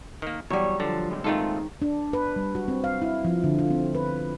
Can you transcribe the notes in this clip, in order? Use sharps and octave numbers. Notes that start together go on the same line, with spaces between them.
D#3 A#3
E2 F#3 G3 C#5
D3 F3 A5
G#3 A#3 C4
G#2 D#3 A3 F4 A4
D4
B4
G3
F#4
C4
F5
E4
F3
D3
F4
C4
B4